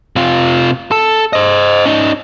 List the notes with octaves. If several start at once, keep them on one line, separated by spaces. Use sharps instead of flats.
C3 F4
A4
C5 D#5
C#4 D#4